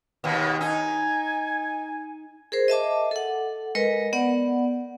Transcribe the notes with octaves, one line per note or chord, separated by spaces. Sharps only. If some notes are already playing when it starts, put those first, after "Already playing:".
D#2 B2
D#4 G#5
G#4 A#4 C5
D#5 E5 A5 D6
A4 F#5
G#3 A#4 B4 D#5
B3 D5 F#5